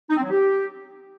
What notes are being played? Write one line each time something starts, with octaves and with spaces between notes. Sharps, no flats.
D#4
C4
F#3
G4